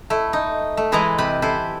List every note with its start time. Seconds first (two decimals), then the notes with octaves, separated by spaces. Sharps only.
0.10 A3 E4
0.33 D#4
0.77 A3
0.92 E3 G#3 E4 B4 D#5 A#5
1.18 C3 G4 B4 B5
1.42 E4 A4 B4 C5